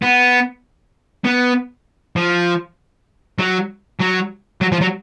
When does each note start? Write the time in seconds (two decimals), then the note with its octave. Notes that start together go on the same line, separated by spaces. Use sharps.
0.02 B3
1.25 B3
2.16 F3
3.39 F#3
4.00 F#3
4.61 F#3
4.72 F3
4.81 F#3